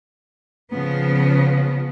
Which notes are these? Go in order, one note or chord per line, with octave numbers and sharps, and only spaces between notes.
C#3 F3 B3